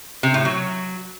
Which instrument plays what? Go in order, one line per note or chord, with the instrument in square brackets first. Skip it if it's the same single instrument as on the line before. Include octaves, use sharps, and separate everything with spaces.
[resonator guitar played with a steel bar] C3
A2
F#3